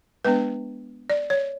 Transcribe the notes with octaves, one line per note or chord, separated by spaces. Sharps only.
G#3 B3 D4 B4
D5
C#5